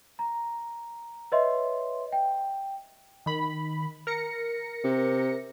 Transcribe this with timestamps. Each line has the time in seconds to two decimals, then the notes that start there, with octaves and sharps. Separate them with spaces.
0.19 A#5
1.32 B4 C#5 D#5 E5 C6
2.12 G5
3.26 D#3 B5
4.07 A#4 A#6 C#7
4.84 C3